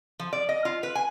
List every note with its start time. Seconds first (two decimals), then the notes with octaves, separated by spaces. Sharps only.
0.19 F3
0.33 D5
0.49 D#5
0.65 F4
0.83 B4
0.95 G#5